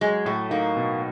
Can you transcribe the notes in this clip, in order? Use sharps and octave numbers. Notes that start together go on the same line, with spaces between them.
F#3 G#3
A2 A3
A#3 D#4
B2